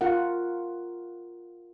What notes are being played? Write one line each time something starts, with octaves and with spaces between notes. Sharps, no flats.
F4 A#4 F#5